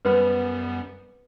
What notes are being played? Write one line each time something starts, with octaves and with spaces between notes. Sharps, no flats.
F#2 G3 B3 B4 C5 B5